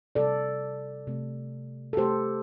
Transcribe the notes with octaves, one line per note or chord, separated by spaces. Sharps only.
C3 G3 A4 D5
C3 A3
A4
C3 A3 G4 C5